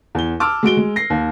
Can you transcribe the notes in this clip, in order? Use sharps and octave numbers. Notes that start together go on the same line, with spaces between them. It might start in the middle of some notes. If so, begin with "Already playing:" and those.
E2 G7
A5 D6 E6 F6
G#3 F#4 D7 G7
G#3
A#6 C7
D#2